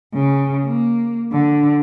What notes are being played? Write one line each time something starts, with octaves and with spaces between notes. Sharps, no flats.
C#3
A#3
D3